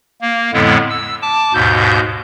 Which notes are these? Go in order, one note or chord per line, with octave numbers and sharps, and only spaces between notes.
A#3
F2 A2 D3 G#3 B3 E4
E6
A5 D6
D#2 G#2 B2 G6